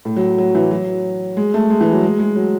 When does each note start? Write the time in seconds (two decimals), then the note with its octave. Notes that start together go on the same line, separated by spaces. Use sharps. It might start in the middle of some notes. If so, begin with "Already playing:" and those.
0.05 A2
0.16 F#3
0.38 F#3
0.55 E3
0.71 F#3
1.37 G#3
1.54 A3
1.70 G#3
1.81 E3
1.92 F#3
2.03 G#3
2.19 G#3
2.36 F#3